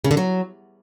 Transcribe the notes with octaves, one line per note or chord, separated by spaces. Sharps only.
C#3
D3
F#3